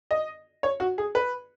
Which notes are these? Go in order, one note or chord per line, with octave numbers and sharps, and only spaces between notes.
D#5
C#5
F#4
G#4
B4